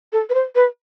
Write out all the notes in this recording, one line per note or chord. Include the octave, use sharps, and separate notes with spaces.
A4
B4
C5
B4